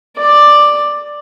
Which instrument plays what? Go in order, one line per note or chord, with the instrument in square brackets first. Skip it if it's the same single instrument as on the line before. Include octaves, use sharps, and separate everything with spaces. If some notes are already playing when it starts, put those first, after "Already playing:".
[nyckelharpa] D5